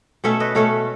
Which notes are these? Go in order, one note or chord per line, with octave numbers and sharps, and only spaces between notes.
B2 A3 C#4 C#5 E5
B4 D#5
B2 A3 C#4 A4 C#5